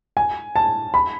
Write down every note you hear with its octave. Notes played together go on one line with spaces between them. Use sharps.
G#5
A5
B5